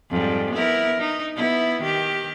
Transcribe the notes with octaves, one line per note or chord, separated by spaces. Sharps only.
F2 G#2 G3
B3 E4 A#4
D#4
B3 E4
D#3 G4